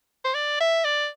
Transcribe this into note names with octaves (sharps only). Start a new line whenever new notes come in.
C5
D5
E5
D5